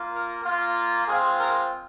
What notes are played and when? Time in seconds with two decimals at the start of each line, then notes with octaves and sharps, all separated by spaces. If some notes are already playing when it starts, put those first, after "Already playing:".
Already playing: A#3 F4
0.11 A#4
0.44 A#3 F4
1.07 G#3 C4 F4 G#4
1.39 A#4